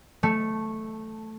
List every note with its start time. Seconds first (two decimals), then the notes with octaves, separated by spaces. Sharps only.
0.23 A3